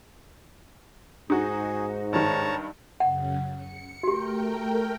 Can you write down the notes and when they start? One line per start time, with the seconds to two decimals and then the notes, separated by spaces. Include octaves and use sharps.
1.30 G#2 D#4 F#4 G#4
2.13 G2 D#3 C#5 A5 A#5
3.00 F#2 C#3 F#5
3.55 C#7
4.03 A3 F#4 G4 A#4 G5